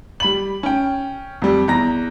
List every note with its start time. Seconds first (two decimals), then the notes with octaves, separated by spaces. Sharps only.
0.20 G3 B5 F#7
0.63 C#4 G5
1.42 F2 G3
1.68 E2 A#5 A#6